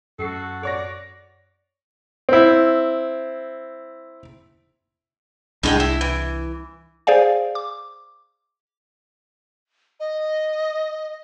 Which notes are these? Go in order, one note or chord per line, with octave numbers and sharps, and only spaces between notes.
F#2 F#4 A4 C7
C#5 D5 C#6 A#6
C4 E4
C2 A2 G#3 D4 G5
E4
E3
G#4 C5 D5 F5 G#5
D6
D#5